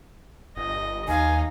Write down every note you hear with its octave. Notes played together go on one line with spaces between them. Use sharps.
G1 D#5
D#2 D#4 F5 G#5